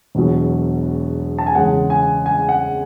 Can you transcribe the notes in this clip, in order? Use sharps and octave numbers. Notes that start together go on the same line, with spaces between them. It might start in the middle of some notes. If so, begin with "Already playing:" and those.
E1 E2 B2 F#3
A5
G#5
E2 C#3 G#3 F#5
G#5
G#5
F#5